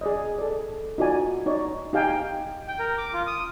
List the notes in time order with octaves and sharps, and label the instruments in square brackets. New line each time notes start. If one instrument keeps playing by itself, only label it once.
[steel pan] G#4 D5 D#5
A4 D5
D#4 F4 F#4 D5 G#5
D#4 C#5 D5
D#4 G4 F5 G5 G#5
[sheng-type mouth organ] G5
A#4
D6
F4
D#6